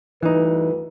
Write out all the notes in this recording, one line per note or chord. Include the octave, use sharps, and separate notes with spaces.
D2 G2 E3 D#4 B4